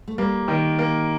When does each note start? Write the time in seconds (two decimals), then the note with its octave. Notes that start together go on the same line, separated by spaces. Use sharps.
0.08 A3
0.18 G3 A#3
0.48 D#3
0.79 A#3